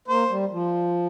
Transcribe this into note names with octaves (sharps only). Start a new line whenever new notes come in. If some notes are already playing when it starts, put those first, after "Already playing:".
A#3 C5
G3
F3